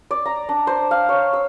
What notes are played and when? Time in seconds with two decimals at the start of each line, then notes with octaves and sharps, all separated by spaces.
0.11 D5
0.26 A#5
0.49 D4
0.67 C5
0.91 F5
1.09 C#5
1.33 E6